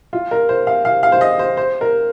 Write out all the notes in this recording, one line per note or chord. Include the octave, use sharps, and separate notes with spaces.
F4
A#4
C5
F5
F5
F5
C5
D#5
C5
C5
A#4